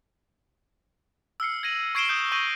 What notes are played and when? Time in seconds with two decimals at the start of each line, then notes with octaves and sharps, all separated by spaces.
1.40 E6 F6 C7 C#7
1.63 G#6 A#6 D#7 F#7
1.95 C#6 G#6 C7 D7 E7 G7
2.08 D#6 G6 C7
2.32 C#6 G6 A#6 D#7 F#7